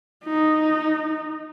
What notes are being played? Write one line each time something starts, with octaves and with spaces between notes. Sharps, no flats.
D#4